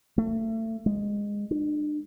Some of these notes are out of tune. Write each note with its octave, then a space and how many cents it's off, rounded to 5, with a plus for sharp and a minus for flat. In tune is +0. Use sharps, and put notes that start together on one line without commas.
A3 +30
G#3 -15
D4 +35